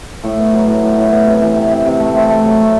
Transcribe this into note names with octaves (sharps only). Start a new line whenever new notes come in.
A2
B3
F#3
A2
A2
A2
B3
C3
E3
C3
C3
C3
A3
C4
A3
F#3
A3